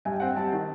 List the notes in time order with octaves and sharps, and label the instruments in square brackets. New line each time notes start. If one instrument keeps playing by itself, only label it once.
[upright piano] G2 [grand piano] G#5
[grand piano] G5
[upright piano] C4 [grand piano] F#5
[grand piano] G5
[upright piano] G3 [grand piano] A5
[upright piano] D#3